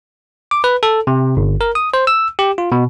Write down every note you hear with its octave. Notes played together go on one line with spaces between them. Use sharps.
D6
B4
A4
C3
G1
A#4
D#6
C5
E6
G4
F4
B2